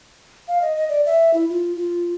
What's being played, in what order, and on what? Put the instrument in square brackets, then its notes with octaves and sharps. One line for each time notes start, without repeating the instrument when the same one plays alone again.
[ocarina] F5
D#5
D#5
D5
E5
E4
F4
F4